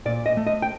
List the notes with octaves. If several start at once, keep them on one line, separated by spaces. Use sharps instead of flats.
A#2 D5
D#5
A3
D#5
G5